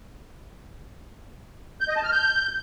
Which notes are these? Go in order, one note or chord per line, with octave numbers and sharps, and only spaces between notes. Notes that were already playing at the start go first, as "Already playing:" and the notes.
G6
D#5
A5
F6
G6